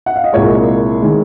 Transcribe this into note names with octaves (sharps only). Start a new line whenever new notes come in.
F#5
F5
D#5
C2 A#2 G#3 C#5
D#3 G#3